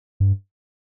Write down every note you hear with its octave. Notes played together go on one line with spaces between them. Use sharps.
G2